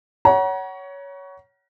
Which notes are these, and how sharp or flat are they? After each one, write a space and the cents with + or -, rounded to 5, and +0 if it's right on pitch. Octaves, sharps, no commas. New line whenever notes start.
C#5 +15 F#5 +25 A#5 +35